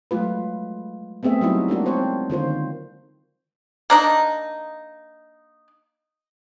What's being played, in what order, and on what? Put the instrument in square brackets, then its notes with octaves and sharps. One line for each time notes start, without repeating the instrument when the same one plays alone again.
[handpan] F#3 G#3 A3 F4 B4
A3 B3 C4 G#4 E5
F#3 G3 D#4 E4 F#4
G#3 A#3 D4 F#4
C4 F#4 C5 C#5
D3 D#3 F4 C5
[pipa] A#3 D4 D#4